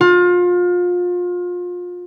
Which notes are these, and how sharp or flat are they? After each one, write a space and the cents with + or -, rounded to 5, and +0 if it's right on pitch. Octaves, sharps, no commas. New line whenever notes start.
F4 +30